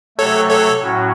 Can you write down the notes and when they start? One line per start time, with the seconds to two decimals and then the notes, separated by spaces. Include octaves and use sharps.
0.18 C3 F#3 A3 A4 C#5
0.50 A4 C#5
0.81 A2 F#3 C#4 F#4